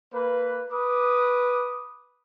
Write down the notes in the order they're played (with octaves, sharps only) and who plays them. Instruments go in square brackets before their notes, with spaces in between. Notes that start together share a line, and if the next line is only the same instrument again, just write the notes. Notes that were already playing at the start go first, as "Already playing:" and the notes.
[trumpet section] A#3 B4
B4 D6 D#6